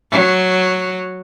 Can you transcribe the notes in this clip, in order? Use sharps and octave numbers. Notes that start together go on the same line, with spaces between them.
F#3